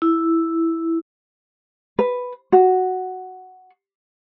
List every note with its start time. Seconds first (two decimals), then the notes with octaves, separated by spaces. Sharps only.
0.02 E4
1.99 B4
2.52 F#4